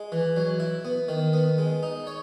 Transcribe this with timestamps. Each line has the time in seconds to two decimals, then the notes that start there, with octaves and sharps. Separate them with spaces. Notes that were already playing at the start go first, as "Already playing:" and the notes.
Already playing: G#3
0.12 E3
0.36 F#3
0.60 E4
0.85 B3
1.08 D#3
1.33 B3
1.58 G#3
1.83 D#4
2.07 C#5